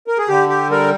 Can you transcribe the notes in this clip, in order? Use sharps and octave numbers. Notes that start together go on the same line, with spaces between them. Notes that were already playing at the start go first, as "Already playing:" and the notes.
A#4
G#4
D3 G4
G4
G3 A#4